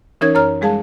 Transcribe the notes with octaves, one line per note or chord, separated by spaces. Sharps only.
E3 C#4 D#4 A#4 C#5 G#6
F#2 A#4 C#5 A#5 F6
G3 G#3 G#4 F5 A5